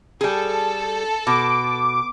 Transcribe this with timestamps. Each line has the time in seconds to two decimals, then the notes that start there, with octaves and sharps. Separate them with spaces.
0.21 G3 G#4 A4
1.27 B2 D6